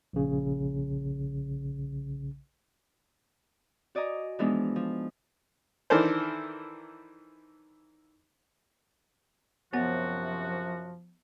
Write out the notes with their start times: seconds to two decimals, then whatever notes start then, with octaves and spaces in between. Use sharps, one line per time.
0.13 A#1 C#3
3.95 F#4 D5 D#5 G#5 A#5
4.39 E3 F3 G#3 B3 D4 D#4
4.76 F3
5.90 D#3 E3 D4 A4 A#4 C5
9.73 F#2 C3 F3 B3 F#4 F#5